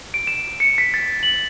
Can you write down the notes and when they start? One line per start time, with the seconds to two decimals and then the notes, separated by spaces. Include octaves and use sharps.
0.14 D7
0.27 E7
0.60 C#7
0.78 B6
0.94 A6
1.23 F#7